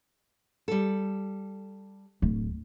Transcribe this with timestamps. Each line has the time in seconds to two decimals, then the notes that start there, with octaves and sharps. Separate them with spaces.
0.68 G3 A4
2.22 D1